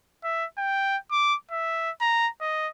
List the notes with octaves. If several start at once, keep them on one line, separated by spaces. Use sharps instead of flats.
E5
G5
D6
E5
A#5
D#5